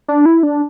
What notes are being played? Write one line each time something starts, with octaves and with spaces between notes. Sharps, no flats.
D4
E4
D4